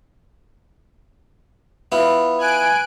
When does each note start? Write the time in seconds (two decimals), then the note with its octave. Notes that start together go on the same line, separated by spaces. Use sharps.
1.92 B3 E4 F4
2.38 G#5 F#6 D7